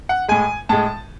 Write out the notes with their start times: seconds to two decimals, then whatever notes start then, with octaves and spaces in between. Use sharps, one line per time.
0.09 F#5
0.28 A2 G#3 G#5
0.69 A2 G#3 A5